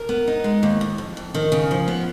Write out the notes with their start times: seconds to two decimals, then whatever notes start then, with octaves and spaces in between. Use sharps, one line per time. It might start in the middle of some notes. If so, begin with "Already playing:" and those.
Already playing: A#4
0.09 B3
0.28 D#4
0.44 G#3
0.63 D#2
0.81 D#2
0.98 F2
1.17 F2
1.34 D#3
1.52 C#3
1.71 F3
1.88 B3